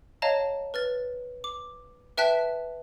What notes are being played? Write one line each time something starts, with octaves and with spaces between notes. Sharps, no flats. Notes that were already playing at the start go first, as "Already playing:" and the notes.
C#5 D#5 F5 A5 A#5
B4 F6 A6
D6
B4 E5 G5 A5 F#6 B6